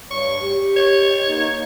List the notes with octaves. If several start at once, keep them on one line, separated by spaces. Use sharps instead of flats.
G2 C#5 C#6
G4
C#5
A#3 D#4